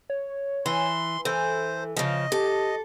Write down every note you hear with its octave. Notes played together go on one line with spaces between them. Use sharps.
C#5
E3 C6
E3 A4 C5
C#3 F3 D#5
G4 A4